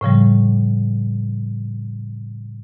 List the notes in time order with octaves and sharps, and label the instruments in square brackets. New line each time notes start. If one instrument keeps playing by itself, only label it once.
[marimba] A2 C#3 F3 G3